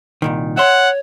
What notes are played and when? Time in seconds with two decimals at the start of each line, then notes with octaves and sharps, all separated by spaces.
0.22 C2 A#2 D#3
0.57 C#5 E5 F#5 C6